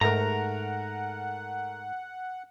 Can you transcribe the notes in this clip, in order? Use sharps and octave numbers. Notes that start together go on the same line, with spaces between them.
G#2 A3 A#4 F#5 A#5